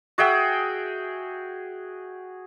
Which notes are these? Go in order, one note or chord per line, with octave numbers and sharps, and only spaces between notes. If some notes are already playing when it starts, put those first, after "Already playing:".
F#4 G#4 E5 G5